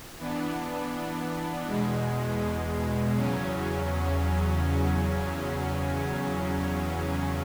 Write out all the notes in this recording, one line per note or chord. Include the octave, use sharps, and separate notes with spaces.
E3 B3 D4
E2 B2 G#3
E2 C#3 F#3 C#4